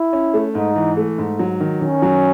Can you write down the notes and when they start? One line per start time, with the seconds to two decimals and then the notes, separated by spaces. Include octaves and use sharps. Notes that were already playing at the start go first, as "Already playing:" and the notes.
Already playing: E4
0.13 C#4
0.34 A3
0.55 G#2 D#4
0.75 E3
0.97 A3
1.18 G#2
1.39 F#3
1.60 D#3
1.81 D#3 C#4
2.02 F#3